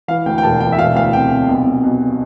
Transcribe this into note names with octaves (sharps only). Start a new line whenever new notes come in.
E3 F5
D2 G5
G5
E1 A5
E3 G5
E5
E1 F5
D2 F5
C3 G5
C3
B1
B1
B2